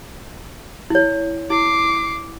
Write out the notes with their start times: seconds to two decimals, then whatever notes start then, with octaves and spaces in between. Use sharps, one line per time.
0.90 E4 C#5
1.50 E4 D6 C7